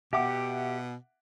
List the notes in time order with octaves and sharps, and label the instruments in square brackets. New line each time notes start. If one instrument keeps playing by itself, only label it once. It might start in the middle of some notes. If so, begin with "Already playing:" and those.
[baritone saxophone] B2 [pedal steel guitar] G4 [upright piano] E5 F#5 D6